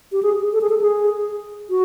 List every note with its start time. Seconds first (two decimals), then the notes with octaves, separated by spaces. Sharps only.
0.12 G4
0.23 G#4
0.53 A4
0.61 G#4
0.70 A4
0.81 G#4
1.70 F#4